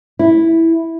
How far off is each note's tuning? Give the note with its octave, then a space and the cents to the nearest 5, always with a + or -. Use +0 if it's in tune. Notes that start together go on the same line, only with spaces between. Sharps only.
E4 -5